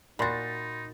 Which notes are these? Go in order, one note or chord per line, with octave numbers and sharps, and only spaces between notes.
A#2 D#4 F#4 B5 C6 A6